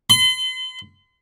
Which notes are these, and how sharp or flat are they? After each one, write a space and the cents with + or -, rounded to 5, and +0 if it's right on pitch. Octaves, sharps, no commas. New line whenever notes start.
C6 -40